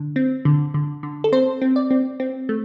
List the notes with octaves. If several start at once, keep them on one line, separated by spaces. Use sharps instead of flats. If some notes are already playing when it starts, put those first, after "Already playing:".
Already playing: D3
C4
D3
D3
D3
A4
C4 C5
C4
D5
C4
C4
A3